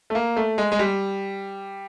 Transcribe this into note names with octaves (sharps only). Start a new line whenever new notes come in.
A3
A#3
A3
G#3
G#3
G3